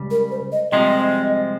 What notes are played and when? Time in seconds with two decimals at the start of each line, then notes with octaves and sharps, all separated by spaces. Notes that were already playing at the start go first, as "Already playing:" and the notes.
Already playing: C#2 C#3 G3
0.11 A#4
0.31 C5
0.52 D#5
0.72 C2 C3 F3 G#3 D#5